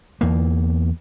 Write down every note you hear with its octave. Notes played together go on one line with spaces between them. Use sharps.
E2 A#3